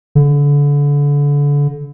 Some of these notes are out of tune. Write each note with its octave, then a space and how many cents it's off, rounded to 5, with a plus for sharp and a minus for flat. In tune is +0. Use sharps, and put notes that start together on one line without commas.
D3 -30